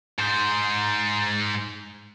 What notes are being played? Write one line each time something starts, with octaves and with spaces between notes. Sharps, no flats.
G#2 C5